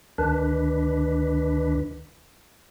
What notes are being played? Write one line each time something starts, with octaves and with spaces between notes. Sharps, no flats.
D2 D#3 D4 B4